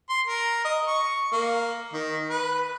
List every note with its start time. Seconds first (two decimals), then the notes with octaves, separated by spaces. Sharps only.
0.09 C6
0.27 A#4
0.64 D#5
0.87 C#6
1.32 A#3
1.93 D#3
2.30 B4